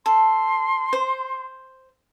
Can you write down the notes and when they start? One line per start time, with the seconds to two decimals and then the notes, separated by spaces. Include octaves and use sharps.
0.06 A4 C6
0.93 C5